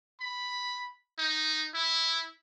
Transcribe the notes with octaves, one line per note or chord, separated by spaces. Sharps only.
B5
D#4
E4